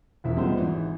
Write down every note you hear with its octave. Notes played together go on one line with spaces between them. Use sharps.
E1 A#1 E2 E5
G3 G#3 B3 D#4 F4 C5
G#1 E3